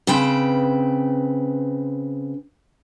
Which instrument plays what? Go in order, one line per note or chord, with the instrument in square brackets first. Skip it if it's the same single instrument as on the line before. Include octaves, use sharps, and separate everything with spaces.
[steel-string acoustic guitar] C#3 C4 B4 G5